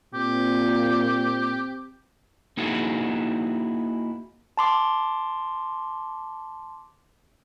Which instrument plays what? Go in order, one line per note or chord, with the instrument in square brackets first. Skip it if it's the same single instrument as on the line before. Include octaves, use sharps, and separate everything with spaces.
[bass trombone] A#2 [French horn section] C4 [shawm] G4
[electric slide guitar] A#3 D#4 E4 F#4 G#4
[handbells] A5 C6 D6